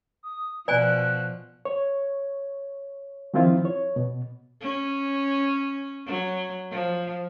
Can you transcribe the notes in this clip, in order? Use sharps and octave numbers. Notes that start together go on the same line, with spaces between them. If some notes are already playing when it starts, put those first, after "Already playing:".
D#6
B2 F3 D5 G#5 F#6
C#5
D#3 F3 C4 E4 F4
C#5
B2
C#4
F#3
F3